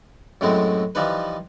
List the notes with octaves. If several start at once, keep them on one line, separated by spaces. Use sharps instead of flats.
F#2 A2 F#3 G#3 C4 E4
E3 F3 G3 D#4 B4